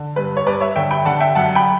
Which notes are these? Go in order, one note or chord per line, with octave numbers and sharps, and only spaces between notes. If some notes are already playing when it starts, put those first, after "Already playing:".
Already playing: D3
G2 B4
C#5
G2 B4 D5
C#5 E5
D3 E5 G5
G5 B5
D3 F#5 A5
E5 G5
F#2 F#5 A5
G5 B5